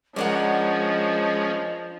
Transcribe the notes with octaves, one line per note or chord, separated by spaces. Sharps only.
F3 G#3 C#4 D4 A#4 D#5 F#5